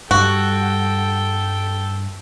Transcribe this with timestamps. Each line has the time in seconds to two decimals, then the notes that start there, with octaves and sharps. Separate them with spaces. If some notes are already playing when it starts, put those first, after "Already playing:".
0.11 G2 G3 F#4 A4 G5